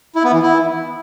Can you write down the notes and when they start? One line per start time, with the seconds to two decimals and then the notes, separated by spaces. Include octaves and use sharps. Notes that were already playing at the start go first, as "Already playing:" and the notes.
0.15 E4
0.24 B3
0.33 E3
0.42 E4